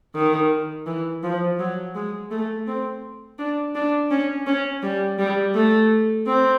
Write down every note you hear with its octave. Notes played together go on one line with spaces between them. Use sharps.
D#3
E3
F3
F#3
G#3
A3
C4
D4
D4
C#4
C#4
G3
G3
A3
C4